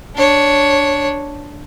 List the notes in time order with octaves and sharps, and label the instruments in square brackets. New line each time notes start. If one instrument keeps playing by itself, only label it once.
[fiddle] D4 C#5